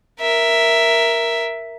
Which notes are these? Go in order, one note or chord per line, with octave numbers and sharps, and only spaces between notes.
A#4 E5